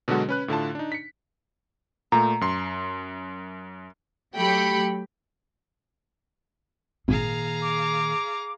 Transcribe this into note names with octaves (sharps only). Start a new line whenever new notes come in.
B2 D3 F#3 G#3 F#4 A4
C#4 B4 F#6
A2 D3 F4 A5
D4 D#4
B6 C#7
A#2 A3 A#5
F#2 C6
F#3 A3 G4 G5 B5 C#7
G#1 A#2 D#3 G#4 F5 A#5
D6